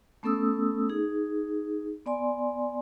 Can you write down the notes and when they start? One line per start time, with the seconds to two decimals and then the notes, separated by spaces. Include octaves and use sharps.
0.23 A3 B3 C#4 A4 D#6 E6
0.89 D#4 G#4
2.06 B3 D5 G#5 C6